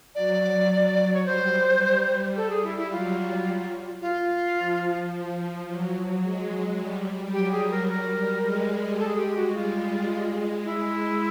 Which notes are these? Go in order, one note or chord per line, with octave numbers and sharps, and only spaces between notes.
F#3 D5
C#5
G3 C5
G3
G3 A4
G#4
E4
E4
F#3 F4
F4
F3
F3
F#3
G#3
G3
F#3 G4
G#4
A#4
G3 A#4
G#3
G#3 A4
G#4
G4
F#4
G3 F4
G#3
G#3 E4